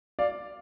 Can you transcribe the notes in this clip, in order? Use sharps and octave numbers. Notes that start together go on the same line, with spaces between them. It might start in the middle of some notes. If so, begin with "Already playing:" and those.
D5 F5